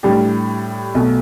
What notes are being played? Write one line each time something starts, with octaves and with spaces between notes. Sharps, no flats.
A2 G3 D4 G4
B1 B2 A3